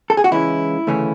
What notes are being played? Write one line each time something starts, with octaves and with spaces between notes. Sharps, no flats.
A4
G#4
F#4
C#2 C#3 E3 G#3 C#4 E4
D2 C#3 E3 A3 C#4